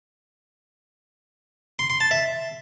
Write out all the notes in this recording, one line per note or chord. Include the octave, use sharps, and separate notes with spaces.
C6
C6
A5
E5